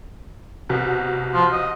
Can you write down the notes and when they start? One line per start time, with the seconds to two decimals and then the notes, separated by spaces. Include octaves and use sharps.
0.69 C2 B2
1.34 F3
1.52 D#5